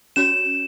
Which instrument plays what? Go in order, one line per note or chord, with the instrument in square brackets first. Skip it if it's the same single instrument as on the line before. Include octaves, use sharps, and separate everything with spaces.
[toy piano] C#4 F#4 C#5 [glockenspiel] E7